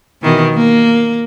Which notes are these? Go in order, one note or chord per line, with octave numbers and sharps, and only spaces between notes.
B2 D#3 E3
A#3